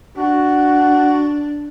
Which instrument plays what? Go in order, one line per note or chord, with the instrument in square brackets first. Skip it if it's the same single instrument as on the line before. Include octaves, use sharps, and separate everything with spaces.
[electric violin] D4 [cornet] F#4